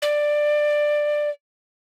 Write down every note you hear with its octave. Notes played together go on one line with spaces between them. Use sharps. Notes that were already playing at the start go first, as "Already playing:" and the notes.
D5